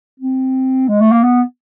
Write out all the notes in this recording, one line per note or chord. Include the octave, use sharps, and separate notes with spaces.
C4
G#3
A3
A#3
B3